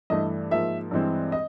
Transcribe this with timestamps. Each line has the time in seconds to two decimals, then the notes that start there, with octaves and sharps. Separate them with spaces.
0.10 G2 E3 A3 D#5
0.51 G#2 F3 A#3 E5
0.91 G2 E3 G#3 C4
1.32 D#5